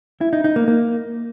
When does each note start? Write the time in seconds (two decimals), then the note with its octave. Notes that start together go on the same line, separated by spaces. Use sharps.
0.21 E4
0.33 D#4
0.44 D#4
0.56 A#3
0.68 A#3